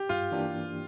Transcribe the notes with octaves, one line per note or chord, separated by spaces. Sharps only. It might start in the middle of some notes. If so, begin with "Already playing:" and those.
Already playing: G4
G2 F4
E3 A#3 D4 G4